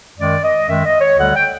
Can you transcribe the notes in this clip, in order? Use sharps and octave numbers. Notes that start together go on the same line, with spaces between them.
F#2 D#3 G#3 D5
D#5
F#2 D#3 G#3 E5
D#5
C#5
D2 D3 G3 F#5
G5